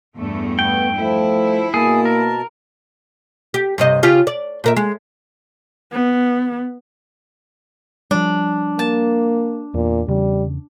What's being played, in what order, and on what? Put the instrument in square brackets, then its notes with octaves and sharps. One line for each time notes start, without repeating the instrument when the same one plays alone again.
[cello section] E2 G2 A3
[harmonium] B3 [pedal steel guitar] G5
[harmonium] F3 [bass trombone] A3 [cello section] E4
[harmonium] B2 A5 [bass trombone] A#3 [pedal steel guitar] G#4
[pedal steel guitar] A#4
[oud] G4
G2 C3 D#5
C#3 F4 G4
D5
A#2 A#4 E5
G#3
[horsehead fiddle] B3
[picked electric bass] F3 G3 [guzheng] D4
[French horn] A#3 [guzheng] A5
[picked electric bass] E2 [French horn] A#2
[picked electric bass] E2 C#3 [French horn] G3